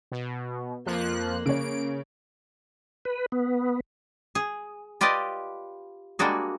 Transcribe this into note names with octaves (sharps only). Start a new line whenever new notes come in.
B2
F2 F3 A#3 F#6
C#3 C#5 D7
B4
B3
G#4
F4 G4 B4 D5 D#5
G3 G#3 A#3 D4 F#4 G#4